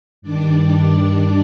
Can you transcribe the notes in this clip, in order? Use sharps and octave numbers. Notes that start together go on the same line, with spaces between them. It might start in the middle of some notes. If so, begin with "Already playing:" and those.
G2 D#3 G3 D4 D5
D4 D5